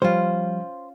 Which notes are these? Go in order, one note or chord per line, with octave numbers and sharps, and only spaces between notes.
F3 G3 C#4 F4 C5